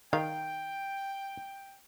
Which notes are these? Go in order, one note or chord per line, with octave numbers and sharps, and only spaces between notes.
D#3 F5 G5